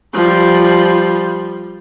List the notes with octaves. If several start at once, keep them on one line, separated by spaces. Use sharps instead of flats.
F3 G3